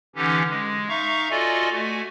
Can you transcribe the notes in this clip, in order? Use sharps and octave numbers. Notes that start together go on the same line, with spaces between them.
D3 E3 C#4 D#4 G4
G#3
D#4 E5 F5 A#5 C#6
F4 F#4 A4 D5 D#5 G#5
A3 F#4 G#5